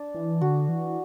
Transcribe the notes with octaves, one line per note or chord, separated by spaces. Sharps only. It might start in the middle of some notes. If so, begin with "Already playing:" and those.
Already playing: D4
E3
D3 F#4
E3